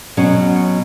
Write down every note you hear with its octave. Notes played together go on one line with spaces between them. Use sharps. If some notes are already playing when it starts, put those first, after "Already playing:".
B2 F#3 C#4